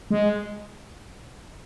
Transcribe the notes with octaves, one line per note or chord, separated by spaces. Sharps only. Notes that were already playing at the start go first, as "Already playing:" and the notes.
G#3